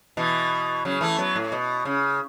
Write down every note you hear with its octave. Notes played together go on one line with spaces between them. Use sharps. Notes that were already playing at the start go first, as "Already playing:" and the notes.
B2 E3
C#3 F#3
E3 A3
F#3 B3
A2
B2
C#3